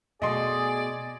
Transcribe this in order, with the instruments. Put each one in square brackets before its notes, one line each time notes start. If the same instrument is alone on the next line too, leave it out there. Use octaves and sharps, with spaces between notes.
[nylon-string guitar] B2 A3 [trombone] G#4 [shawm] D5 [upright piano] D#5 C6